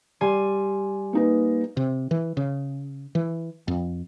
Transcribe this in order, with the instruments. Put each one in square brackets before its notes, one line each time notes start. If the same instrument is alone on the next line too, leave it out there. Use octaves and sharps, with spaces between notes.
[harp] G3 G#5 C6
[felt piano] A#3 D#4 B4
[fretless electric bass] C3
E3
C#3
E3
F2